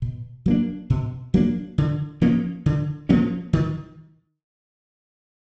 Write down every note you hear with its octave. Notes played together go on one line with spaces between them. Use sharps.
B2
F#3 A#3 D4
B2
F#3 A#3 D4
D3
F3 A#3 C#4
D3
F3 A#3 C#4
D#3